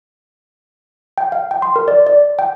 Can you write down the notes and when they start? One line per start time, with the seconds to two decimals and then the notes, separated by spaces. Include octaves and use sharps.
1.18 G5
1.32 F5
1.51 G5
1.62 C6
1.76 A#4
1.88 D5
2.07 D5
2.39 G5